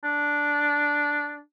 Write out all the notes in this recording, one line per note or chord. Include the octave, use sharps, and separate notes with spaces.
D4